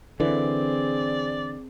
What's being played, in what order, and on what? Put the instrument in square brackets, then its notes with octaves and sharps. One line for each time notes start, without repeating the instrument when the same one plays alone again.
[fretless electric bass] D3 E3 [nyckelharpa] C4 G#4 [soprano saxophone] D5